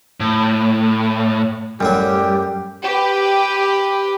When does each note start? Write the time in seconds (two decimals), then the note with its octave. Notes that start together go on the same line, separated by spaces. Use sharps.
0.20 A2
1.80 F#2 A2 F#3 G3 G4
2.83 G4 B4